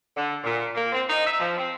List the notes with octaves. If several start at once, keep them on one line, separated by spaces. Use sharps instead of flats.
D3
A#2
A#3
C4
D#4
E5
F3
C4